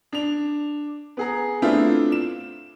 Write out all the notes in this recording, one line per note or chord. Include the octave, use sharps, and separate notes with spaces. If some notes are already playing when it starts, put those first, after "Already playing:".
D4 F7
B3 G#4 A#5
A3 B3 C4 D4 E4 F4
E7